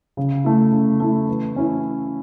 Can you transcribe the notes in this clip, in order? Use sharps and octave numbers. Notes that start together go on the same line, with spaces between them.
C#3
A3 E4
C#3
A3 E4
E3
C#4 E4